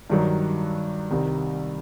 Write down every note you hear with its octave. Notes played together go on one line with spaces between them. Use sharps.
G2 D#3 F#3
C2 C3 D#3